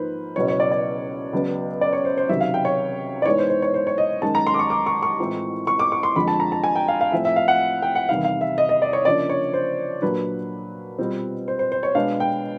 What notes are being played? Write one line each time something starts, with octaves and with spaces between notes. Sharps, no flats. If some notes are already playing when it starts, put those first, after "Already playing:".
Already playing: G#2 F3 A#3 D#4 B4 C5
C#2 B2 F#3 B3 E4 C#5
C#5
D5
D5
C#2 C#3 F#3 B3
D5
C#5
C5
C5
C#2 C3 D#3 F#3 E5
F5
G5
C#5
D5
G#2 E3 G#3 B3 C#5
C5
C5
C#5
C5
C#5
D#5
F#2 D#3 G#3 A5
A#5
C6
D6
C#6
D6
C#6
C#6
A2 E3 G#3 C4 F4
C#6
D6
C#6
C6
F2 D3 F3 G#3 B5
A5
A#5
A5
G#5
G5
F5
F5
A2 F3 A3 C4 E5
E5
F5
F#5
G5
F#5
E2 C3 D#3 G3 F5
F5
E5
D#5
D#5
D5
C#5
C#3 F3 A#3 D4 D5
C#5
C5
A#2 F#3 A#3 D4 B4
B2 G3 C4 F4
C5
C5
C5
C#5
B2 G#3 B3 D4 F5
G5